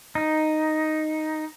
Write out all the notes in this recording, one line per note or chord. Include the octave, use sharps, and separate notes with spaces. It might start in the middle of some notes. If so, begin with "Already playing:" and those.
D#4